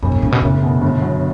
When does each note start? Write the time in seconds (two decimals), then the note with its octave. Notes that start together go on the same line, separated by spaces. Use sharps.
0.02 E1 F#2
0.12 G2
0.22 A2 C#3
0.32 B2
0.42 F#1 A2
0.62 B2
0.82 G1
1.02 F#3